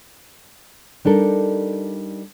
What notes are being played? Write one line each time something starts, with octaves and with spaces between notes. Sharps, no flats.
G3 D4 D#4 A4 A#4